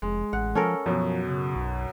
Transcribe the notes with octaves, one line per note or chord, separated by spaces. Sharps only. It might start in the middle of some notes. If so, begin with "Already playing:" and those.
F1 G#3
A1 F#5
F3 C#4 A4 A#4
F#2 B2 F3
C#3
B1